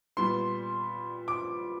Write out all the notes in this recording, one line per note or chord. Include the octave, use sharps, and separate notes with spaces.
A#2 G3 B3 C6
D6